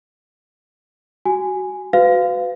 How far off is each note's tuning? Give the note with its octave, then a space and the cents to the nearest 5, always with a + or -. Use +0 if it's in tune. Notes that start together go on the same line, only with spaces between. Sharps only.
F#4 +20 G#5 +0
F#4 +0 B4 +35 F5 +0